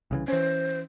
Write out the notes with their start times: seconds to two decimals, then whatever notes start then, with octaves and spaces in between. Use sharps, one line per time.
0.11 C2 C#3 E3
0.28 E3 C#4 C5